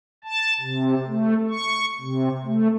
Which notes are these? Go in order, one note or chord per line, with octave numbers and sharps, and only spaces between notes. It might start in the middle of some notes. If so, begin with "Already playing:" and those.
A5
C3
A3
C#6
C3
A3